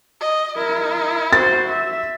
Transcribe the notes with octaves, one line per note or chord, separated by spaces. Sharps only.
D#5
E4 A#4
F#4 C5 A6
E5